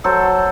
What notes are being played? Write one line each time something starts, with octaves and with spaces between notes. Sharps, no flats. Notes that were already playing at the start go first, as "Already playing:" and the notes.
F#3 A4 C5